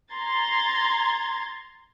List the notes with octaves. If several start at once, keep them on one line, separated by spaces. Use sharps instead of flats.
A#5 C6 G#6 A6